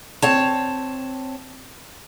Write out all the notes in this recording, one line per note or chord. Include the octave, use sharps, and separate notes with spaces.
C4 C#5 A5